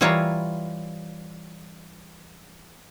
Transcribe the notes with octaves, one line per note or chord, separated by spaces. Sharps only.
E3 G3 E4 F4 C#5 A#5